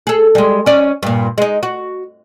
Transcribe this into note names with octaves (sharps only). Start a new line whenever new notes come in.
G#4 A4
G3 G#3
C#4 D5
G2 A#2
G#3 D#4
F#4